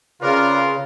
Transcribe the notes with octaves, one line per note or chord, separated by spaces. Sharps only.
C#3 C4 F4 A#4 B4 D5